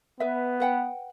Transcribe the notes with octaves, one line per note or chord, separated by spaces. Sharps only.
B3 B4 E5
B4 F#5 G5